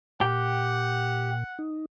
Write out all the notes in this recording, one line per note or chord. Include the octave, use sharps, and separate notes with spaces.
A#2 G4 F#5
D#4